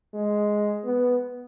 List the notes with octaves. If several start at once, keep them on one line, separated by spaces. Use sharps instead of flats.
G#3
B3